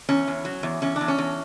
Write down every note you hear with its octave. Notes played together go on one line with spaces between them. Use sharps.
E2 C#4
E2
F#3
E2
E2 C#4
D4
E2
C#4
E2